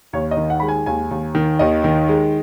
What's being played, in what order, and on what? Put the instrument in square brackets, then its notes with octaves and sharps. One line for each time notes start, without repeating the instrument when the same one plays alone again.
[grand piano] D#2 C#5
D#5
D#3
F#5
G#3 B5
G#5
D#2 G#5
D#2
D#3
D#2 D#5
D#3
G#3